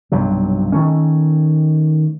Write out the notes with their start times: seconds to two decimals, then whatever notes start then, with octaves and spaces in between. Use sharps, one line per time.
0.12 B1 G2 C3 F#3
0.72 D#3 A3 C#4